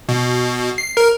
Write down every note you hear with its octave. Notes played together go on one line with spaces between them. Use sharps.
B2
C7
A#4